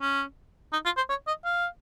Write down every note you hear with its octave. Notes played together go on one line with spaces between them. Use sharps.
C#4
D#4
F4
C5
C#5
D#5
F5